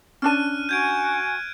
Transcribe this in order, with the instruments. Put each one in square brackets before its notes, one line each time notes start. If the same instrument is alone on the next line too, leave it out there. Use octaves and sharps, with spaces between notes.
[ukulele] C#4 D4 A5 [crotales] F6 F#6 D#7
[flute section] F#4 G#5 [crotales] G6 G#6 D7